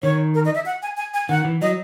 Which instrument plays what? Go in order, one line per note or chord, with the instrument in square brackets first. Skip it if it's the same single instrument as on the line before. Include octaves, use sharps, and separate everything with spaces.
[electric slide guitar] D#3 [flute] C#5
[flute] A#4
D#5
E5
F#5
G#5
G#5
G#5
[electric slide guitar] D#3 [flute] F#5
[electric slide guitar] E3
[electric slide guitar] F#3 [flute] D#5